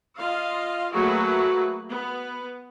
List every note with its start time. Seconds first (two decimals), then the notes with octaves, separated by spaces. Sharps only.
0.18 F4 D#5 F5
0.94 F#3 A3 A#3 F#4 G#4 B4
1.90 B3